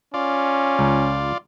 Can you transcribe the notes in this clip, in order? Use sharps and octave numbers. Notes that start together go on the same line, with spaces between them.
C#4 F4 D5
C#2